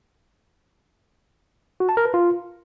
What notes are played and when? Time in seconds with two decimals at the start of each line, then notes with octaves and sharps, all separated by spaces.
1.80 F#4
1.89 A5
1.97 A#4
2.05 B4
2.14 F4